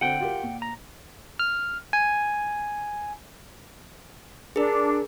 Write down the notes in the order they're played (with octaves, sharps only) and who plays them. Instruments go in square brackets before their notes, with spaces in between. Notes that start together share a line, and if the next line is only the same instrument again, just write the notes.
[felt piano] D3 C4 [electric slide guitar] F#5 G5
[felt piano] F4 G4 A#4
A#2
[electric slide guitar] A#5
[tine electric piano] F6
G#5
[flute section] D4 [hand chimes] G#4 A#4